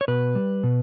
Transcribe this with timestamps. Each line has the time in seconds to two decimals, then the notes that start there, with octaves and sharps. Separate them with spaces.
0.01 C#5
0.08 B2 B4
0.35 G3
0.63 B2